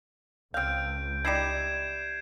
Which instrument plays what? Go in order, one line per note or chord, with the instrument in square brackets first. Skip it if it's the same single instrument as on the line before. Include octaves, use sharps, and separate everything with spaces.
[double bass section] C#2 [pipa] C4 F5 [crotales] G6 D7
[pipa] G3 D#4 E4 [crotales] G#6 C7 E7